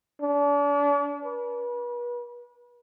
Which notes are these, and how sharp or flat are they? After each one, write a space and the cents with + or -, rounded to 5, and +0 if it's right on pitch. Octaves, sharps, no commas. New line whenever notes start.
D4 -40
B4 -40